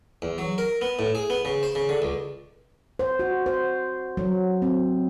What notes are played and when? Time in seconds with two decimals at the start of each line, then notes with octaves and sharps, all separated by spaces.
0.22 E2
0.38 F#3
0.58 A#4
0.81 B3
0.99 A2
1.15 G#4
1.30 B3
1.45 C#3
1.63 C5
1.75 C#3
1.89 D3
2.02 C#2
2.99 C5
3.19 F#4
3.46 C5
4.17 F#3
4.62 C4